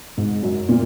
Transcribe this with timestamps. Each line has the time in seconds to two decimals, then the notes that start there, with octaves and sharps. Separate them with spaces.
0.17 G#2
0.43 F#2
0.69 A#2